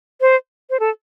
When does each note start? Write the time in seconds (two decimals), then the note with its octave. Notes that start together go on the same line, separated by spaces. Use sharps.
0.21 C5
0.70 C5
0.80 A4